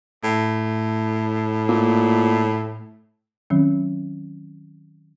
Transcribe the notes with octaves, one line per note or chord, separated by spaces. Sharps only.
A2
A#2
D#3 F#3 C4 C#4